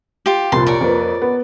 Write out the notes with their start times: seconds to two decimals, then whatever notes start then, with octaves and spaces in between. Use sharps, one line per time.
0.26 F4 G4
0.52 C2 F2 A#2 A5 C6
0.67 A#4 C#5 D5
0.81 F2 A#3 B4
1.22 B3